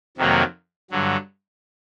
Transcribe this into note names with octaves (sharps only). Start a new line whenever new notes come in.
F2 C3 D#3 F#3 A#3
G2 D3 F#3